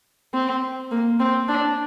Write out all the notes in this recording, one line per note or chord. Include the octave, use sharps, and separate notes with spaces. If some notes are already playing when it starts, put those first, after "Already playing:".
C4
A#3
C4
D4